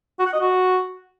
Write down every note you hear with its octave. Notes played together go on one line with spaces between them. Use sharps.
F#4
F#5
D#5
F#4